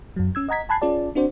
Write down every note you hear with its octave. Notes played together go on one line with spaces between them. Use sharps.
F#2 F#3
C#4 E6 G#6
D#5 F#5 A#5 G#6 B6
G#5 A5 B5 F#6 G#6 C7
C#4 F4 G#4 D5 A5
C4 D4 F#4 C5 D5